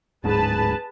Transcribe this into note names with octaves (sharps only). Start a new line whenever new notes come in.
D1 G#2 G#4 B4 A5